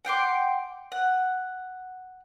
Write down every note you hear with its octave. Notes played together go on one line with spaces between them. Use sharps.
F#5 G5 C6 D6
F#5